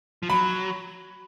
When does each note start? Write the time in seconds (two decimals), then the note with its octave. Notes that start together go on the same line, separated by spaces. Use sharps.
0.23 F3
0.30 F#3 B5